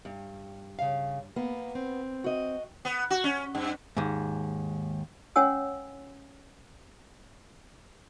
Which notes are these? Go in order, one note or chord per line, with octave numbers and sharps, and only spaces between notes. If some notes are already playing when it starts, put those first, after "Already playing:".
G2
C#3 F5
A#3 B3
C4
F#4 D#5
B3
F#4
C#4
G2
D#2 G#2
C#4 C#5 F#5 G#5 E6